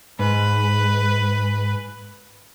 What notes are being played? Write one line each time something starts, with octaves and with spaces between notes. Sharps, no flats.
G#2 B4